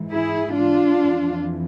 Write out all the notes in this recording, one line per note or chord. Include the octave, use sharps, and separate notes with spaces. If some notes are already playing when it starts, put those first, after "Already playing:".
Already playing: G#2 E3
E4 G#4
D4 F4
F2 E3